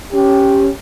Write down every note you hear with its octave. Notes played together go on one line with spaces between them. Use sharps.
C#4 G4